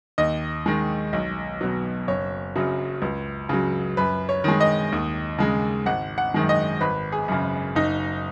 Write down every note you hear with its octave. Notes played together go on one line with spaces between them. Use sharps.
D#2 D#5
D#3 G#3
B1
B2 F#3
F#1 C#5
F#2 C#3 F#3
C#2
C#3 F#3
F#2 B4
C#5
D#3 G#3
D#5
D#2
C#3 G#3
G#1 F#5
F#5
F#2 D#3 G#3
D#5
G#1 B4
G#4
F#2 C#3
F#1 D#4